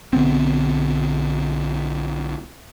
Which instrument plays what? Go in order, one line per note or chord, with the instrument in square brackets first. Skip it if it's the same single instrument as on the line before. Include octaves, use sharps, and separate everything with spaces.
[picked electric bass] B1 D3 B3 C4